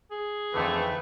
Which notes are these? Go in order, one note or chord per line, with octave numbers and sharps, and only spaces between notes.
G#4
F2 D3 E3 A3 B4 G5